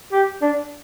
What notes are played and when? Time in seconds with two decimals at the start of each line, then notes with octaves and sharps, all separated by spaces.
0.12 G4
0.42 D4